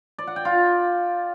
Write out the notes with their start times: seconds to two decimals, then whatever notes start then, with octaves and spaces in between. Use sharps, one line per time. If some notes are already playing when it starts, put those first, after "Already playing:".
0.18 D5
0.27 F#5
0.36 G5
0.45 F4